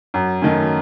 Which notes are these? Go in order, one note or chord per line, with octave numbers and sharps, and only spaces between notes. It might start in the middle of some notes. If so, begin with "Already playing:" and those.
F#2
D#3 A3 C#4